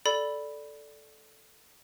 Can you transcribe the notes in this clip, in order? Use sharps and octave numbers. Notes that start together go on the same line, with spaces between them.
A4 D5 B5